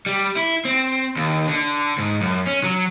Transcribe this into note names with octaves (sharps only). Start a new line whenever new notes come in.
G3
E4
C4
D#2
D3
G#2
F#2
C#4
F#3